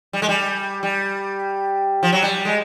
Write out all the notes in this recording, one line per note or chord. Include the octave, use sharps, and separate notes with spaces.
G3
G#3
G3
G3
F3
F#3
G3
G#3